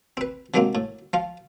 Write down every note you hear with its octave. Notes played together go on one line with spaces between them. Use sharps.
C4 B4
C3 D#3 F#3 G#3 A#3 C4
A2
F3 F4